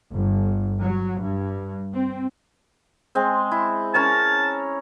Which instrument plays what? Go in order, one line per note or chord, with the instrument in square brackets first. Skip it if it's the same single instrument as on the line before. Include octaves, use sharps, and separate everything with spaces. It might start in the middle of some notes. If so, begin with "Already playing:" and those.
[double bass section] G1
F#3
G2
C4
[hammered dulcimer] G#3 C4
E4
[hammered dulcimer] C#4 A#4 C#5 [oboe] A5